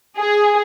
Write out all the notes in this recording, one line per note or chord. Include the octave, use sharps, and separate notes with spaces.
G#4